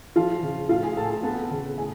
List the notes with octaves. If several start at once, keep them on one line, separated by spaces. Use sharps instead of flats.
F3 F4 F5
C#3
A2 F4 F5
G#4 G#5
A2 A4 A5
A4 A5
B3 A4 A5
C#3
A2 G#4 G#5